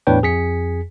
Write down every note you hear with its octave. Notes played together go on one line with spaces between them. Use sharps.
E2 A2 D4 B4 C#5 G5
F2 G#4 G#5 B6 C#7